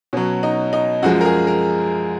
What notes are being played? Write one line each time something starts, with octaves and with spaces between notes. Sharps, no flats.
B2 F#3 C#4
D#4
D#4
F#2 F3 G#3 F#4
A#4
G#4
A#4